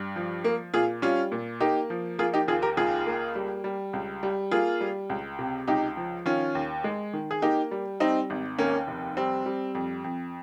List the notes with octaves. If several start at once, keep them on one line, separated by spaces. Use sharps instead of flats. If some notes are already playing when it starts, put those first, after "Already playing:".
Already playing: G2
F3
A#3
A#2 F4 G#4
G3 C#4 F4
A#2
A#3 D#4 G4
F3
A#3 F4 G#4
D#4 G4
D#2 F4 G#4
G4 A#4
C#2 F4 G#4
A#3
G3
G3
C#2
G3
A#3 F4 G#4
G3
C#2
C3
C#2 D#4 G4
F3
D#3 C#4 F4
D#2
G#3
D#3
G#4
A#3 D#4 G4
G3
G3 C4 D#4
G#1
D#2 A#3 C#4
F1
G3 C4
G3
F2
F2